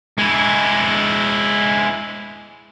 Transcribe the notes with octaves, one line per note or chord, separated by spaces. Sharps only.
G#3 E4